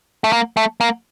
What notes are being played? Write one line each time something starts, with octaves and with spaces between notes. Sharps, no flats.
A3
A#3
A3
A#3